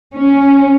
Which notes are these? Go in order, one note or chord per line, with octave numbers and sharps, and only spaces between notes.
C#4